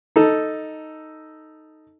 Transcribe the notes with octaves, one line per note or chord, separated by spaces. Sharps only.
D#4 A4